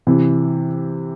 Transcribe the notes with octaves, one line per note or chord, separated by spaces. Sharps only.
C3 E3